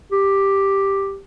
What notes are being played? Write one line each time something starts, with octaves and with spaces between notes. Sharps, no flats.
G4